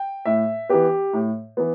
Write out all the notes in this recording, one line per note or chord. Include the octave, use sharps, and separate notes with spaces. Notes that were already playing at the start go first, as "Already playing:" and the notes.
Already playing: G5
A2 E5
E3 B3 G4
A2
E3 B3